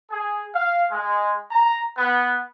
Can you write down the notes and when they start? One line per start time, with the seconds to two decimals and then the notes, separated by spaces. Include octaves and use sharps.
0.11 G#4
0.54 F5
0.91 G#3
1.51 A#5
1.97 B3